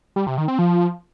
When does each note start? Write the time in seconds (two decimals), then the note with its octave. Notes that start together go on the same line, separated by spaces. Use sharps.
0.16 G3
0.27 C3
0.37 D#3
0.48 C4
0.59 F3